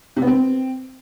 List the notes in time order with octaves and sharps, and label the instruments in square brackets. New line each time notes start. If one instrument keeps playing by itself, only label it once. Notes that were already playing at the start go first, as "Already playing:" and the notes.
[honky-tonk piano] C3
B3
C4